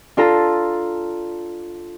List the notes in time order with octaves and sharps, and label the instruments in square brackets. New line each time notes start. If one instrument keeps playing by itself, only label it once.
[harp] D4 F4 A4 A#5